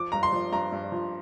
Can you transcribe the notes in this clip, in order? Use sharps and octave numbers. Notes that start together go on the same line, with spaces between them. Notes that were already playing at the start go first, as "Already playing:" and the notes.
Already playing: F3 D6
G2 A#5
C6
F3
G2 A#5
G2
F3